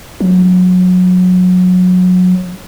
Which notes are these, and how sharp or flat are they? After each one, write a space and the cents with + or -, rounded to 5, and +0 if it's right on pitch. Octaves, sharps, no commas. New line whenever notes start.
F#3 -25